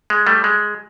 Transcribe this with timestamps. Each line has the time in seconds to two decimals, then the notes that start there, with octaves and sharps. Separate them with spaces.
0.10 G#3
0.27 G3 A3
0.44 G#3